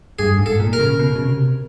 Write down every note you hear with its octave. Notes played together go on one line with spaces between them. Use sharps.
G2 G#4
G#2
A4
A#2
A#4
C#3
B2
C#3
C3